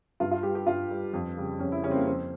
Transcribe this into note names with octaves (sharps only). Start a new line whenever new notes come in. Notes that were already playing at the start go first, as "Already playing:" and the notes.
G2 F4
F4
G3 G4
G4
G2 F4
G3
F2
C#3 G3
F2 C#4
E4
C#3 G3 C#4
C4
A#3
F2 C4